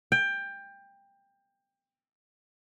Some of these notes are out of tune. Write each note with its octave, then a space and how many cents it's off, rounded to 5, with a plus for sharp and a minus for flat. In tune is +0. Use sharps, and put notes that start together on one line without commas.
G5 +20